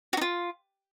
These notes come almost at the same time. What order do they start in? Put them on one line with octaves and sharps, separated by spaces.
F#4 D#4 F4